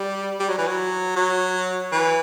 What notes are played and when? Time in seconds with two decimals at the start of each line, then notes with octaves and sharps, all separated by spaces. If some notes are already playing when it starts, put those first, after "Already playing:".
Already playing: G3
0.39 G3
0.49 F#3
0.58 E3
0.67 F#3
1.16 F#3
1.92 E3